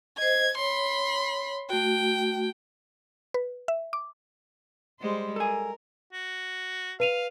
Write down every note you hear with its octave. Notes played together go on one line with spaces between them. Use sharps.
C5 D#5 G#6
C#5 B5 C6
A3 F#4 G5
B4
E5
D6
G3 G#3 C5
A4 A#4 G#5
F#4
B4 F5 D#7 F7